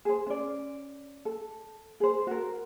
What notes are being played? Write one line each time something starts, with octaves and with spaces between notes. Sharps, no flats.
G#4 C5
C#4 D5
A4
G#4 C5
F#4 A#4